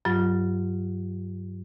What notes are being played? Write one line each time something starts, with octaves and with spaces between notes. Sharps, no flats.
G2 F#3 F4